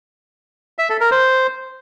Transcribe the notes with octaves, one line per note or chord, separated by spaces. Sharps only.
E5
A4
A#4
C5